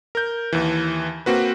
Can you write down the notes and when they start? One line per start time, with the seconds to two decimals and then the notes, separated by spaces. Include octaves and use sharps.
0.15 A#4 G6
0.52 D#2 E3
1.26 A#3 C4 F#4 B4